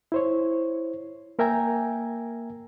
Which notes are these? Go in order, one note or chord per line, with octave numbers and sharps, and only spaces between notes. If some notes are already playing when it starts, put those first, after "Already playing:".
E4 C5 C#5
A#3 A#4 E5 G5 G#5 A#5